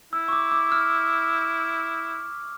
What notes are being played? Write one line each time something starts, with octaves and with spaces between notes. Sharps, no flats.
E4 E6
C#6
D6
D6
F6